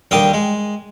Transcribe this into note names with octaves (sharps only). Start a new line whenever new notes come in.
D#2 D3 G3 G5 D6 D#6
G#3